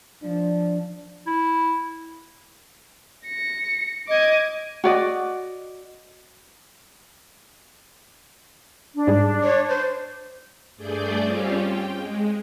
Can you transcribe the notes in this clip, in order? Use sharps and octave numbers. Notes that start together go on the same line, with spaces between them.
F3 D4
E4
A#6 C#7
D#5 D6 G#6
F#4 D5 D#5
D4
G#2 G3 G#4
C#5
C5
G2 A3 G#4 D5 G6
G3 C4 C#4 F4 G4
G5
G#3